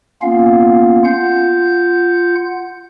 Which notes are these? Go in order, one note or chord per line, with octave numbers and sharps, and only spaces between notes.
A#3 B3 C#4 F4 F5
F4 F#5 G6